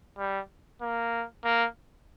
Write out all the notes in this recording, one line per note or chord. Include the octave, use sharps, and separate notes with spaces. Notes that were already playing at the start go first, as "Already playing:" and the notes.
G3
A#3
A#3